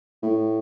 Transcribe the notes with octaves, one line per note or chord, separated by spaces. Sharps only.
A2